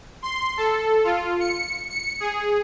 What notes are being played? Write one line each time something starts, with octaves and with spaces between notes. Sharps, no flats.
C6
A4
F4
C#7
C#7
G#4